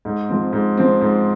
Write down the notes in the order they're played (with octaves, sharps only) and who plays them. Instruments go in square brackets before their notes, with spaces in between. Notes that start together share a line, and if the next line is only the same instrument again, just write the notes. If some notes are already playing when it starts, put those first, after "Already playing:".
[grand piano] G#2
F3 C4
G#2
F3 C4
G#2